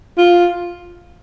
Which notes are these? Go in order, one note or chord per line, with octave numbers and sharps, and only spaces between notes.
F4